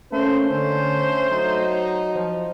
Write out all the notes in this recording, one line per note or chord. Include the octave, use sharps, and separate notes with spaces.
A3 A#3 C#4 C5
D3 C#4 C5
F#3 D#4
F3